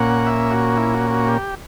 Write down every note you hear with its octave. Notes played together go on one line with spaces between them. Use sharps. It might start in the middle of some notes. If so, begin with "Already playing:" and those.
Already playing: A#2 A#3 C#4 F#5
E5
F#4
E4
F#4
F#4
G4